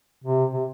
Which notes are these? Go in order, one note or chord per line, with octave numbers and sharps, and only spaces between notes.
C3
C3